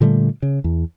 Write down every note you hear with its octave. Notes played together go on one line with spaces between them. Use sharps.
A#2 D3 G3 A3
C#3
E2